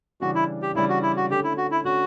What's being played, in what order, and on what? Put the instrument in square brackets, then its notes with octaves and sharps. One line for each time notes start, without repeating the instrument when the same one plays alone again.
[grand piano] C#3 E3 G3 D4 [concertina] F#4
[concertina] E4
G4
[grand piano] C#3 E3 G3 D4 [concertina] E4
[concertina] F#4
E4
F#4
[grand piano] D3 A3 C#4 [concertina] G4
[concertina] E4
F#4
E4
[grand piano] D3 A3 C#4 [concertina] F#4